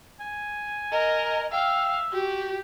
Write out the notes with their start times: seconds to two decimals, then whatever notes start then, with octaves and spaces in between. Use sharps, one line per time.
0.20 G#5
0.92 A#4 D#5
1.52 E5 F5 G5
2.13 F#4 G4